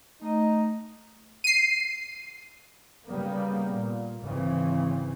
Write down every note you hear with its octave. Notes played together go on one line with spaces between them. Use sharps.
A3 D#4
C7 D#7
C#3 G3 A#3 B3
A#2
G#1 C#3 E3 C4